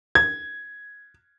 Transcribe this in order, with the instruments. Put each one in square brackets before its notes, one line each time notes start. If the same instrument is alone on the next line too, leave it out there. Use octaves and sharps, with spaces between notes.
[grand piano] G#6